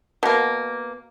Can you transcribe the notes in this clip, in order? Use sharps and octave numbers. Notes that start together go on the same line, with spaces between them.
B2 A#3